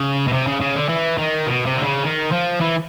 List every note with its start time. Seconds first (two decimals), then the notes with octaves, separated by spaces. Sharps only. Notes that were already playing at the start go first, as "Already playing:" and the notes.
Already playing: C#3
0.28 B2
0.33 C3
0.47 C#3
0.61 C#3
0.76 D3
0.89 E3
1.18 D#3
1.47 B2
1.66 C3
1.77 D3
1.84 C#3
2.04 D#3
2.32 F3
2.61 E3